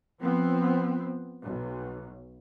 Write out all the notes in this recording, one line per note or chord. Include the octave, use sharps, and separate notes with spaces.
F3 B3 C4
B1